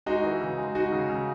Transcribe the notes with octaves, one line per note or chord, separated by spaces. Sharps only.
G#3 D#4 F#4
E3
C#3
G#3
G#3 D#4 F#4
C#3
C#3